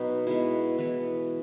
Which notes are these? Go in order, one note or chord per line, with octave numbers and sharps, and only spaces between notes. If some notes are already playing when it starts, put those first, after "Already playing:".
Already playing: B2 F#3 B3 D#4
B2 G#3 B3 E4
E3 B3